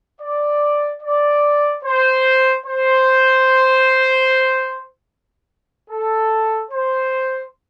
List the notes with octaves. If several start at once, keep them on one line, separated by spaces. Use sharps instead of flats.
D5
D5
C5
C5
A4
C5